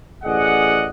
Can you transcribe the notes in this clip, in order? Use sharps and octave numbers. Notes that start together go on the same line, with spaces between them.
A1 G#4 D5 D#5 F#5